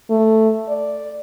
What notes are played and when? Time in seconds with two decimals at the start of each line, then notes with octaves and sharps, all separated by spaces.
0.10 A3
0.69 D5